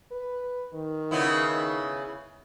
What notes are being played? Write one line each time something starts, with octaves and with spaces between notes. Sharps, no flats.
B4
D#3
C#3 B3 E4